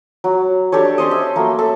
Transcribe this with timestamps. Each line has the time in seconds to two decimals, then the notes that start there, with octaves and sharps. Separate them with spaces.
0.24 F#3
0.72 D4 G4 A4 C#5
0.98 C#4 A4 C5 D#5
1.11 E5
1.36 F#3 A3 A#3
1.59 A4 E5